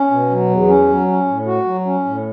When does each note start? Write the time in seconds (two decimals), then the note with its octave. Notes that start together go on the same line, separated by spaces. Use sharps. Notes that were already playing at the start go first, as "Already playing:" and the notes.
Already playing: C#4
0.11 B2
0.30 F#3
0.50 E2
0.68 C#4
0.88 F#3
1.07 C#4
1.27 A2
1.46 F#4
1.65 F#3
1.86 C#4
2.05 A2